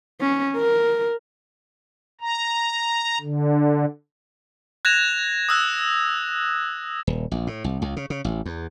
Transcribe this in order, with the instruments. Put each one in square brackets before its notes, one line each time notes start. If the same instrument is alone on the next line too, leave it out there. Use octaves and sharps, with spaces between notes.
[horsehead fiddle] C#4
A#4
[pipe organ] A#5
D3
[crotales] F#6 G#6 A#6 E7 F7
D#6 E6 F#6
[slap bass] D#1
A#1
A2
C2
C#2
C#3
C#3
A1
E2